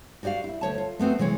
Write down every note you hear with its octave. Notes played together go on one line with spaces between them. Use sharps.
F#4 G4 D5 D#5 F5
E4
D2 C#5 A5
F4
A3 B3 C4 F#4
C3 E3 G#3 C5 C#5